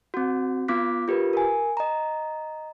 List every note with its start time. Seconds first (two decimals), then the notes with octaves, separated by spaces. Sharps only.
0.14 C4 F#4
0.68 B3 F4 D6 F#6 B6
1.08 F4 G4 A#4 B4
1.33 A#4 G#5
1.77 D#5 A#5